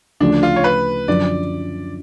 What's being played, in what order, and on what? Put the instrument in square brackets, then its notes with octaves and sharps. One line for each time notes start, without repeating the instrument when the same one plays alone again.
[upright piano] D2 C#3 F3 A3 [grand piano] D4
[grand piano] F4
C#5
B4
[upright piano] F#2 D3 F3 [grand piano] D5